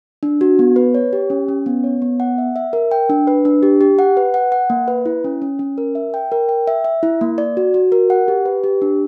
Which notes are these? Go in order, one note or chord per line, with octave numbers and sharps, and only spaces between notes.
D4
F#4
B3
B4
C#5
G4
C#4
C#4
B3
C#5
B3
F#5
E5
E5
A#4
G5
D4
B4
D4
G4
G4
F#5
B4
F#5
F#5
A#3
B4
E4
C#4
C#4
C#4
A#4
E5
G5
A#4
G5
E5
E5
E4
A#3
D5
F#4
F#4
A#4
F#5
G4
B4
G4
D4